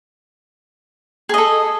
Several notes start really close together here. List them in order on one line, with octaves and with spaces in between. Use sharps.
G#4 D#5 A4